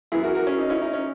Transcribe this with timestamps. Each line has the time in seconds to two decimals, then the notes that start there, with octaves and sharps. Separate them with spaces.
0.12 F#2 E3 B3 E4 G#4
0.24 F#4 A#4
0.35 F#4 A#4
0.47 C#4
0.58 D#4
0.70 C#4 E4
0.82 D#4
0.93 C#4